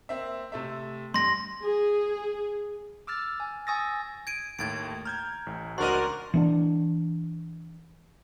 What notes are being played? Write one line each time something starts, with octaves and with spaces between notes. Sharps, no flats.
A#3 C4 E5
C3 A3 E5
G2 C6 A#6
G#4
D6 E6 F6 A6
G#5
G#5 C#6 D#6 E6 A6 A#6
G#6 D7 D#7
D#2 A2 G#6 A6 D7
A#5 F6 G6 G#6
A1 A2
C#2 D4 F#4 A#4 C5 D#5 C6
E3 C4 D4